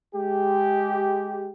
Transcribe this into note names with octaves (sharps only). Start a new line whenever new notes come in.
G#3 G4